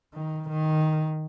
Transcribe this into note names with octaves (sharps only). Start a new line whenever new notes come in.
D#3
D#3